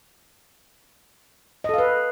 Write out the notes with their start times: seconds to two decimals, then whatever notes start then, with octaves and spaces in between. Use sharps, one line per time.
1.64 D#5
1.69 A4
1.74 F5
1.78 B4